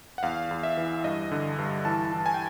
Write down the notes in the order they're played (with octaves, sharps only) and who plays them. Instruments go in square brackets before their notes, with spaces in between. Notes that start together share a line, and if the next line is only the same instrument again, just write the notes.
[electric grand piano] F#5
E2 F5
E2
E5
E3
G2 D#5
D3
G2
E3 A5
E3
G#5
G5